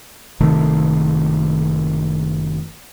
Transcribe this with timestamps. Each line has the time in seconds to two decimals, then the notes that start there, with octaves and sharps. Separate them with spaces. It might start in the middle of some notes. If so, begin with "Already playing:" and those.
0.40 F#1 C3 D#3 A3